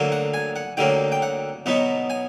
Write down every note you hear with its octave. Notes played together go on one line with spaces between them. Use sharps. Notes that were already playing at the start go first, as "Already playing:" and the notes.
Already playing: D2 D3 F#3 A#3
F#5
G#5
F#5
D2 D3 F#3 A#3 G5
G5
F#5
B2 F#3 B3 D#4 F#5
G#5